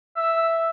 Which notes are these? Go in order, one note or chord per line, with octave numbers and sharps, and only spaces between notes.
E5